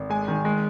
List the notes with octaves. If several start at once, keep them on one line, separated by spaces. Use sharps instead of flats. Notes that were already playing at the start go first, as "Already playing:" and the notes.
Already playing: G#1
G#3 G#5
D#3
G#3